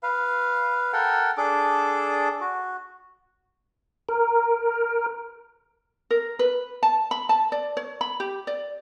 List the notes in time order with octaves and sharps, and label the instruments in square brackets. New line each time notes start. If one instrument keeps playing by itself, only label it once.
[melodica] B4 F5
A4 A#4 F#5 G5
D4 G#4 A4 D6
F#4
[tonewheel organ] A#4
[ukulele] A#4
B4
A5
B5
A5
D5
C#5
B5
G4
D5